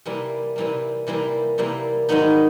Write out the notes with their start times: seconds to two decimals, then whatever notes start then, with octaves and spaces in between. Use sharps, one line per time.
0.06 C3 E3 G3 A#3
0.56 C3 E3 G3 A#3
1.07 C3 E3 G3 A#3
1.58 C3 E3 G3 A#3
2.09 G#2 D#3 F#3 B3 D#4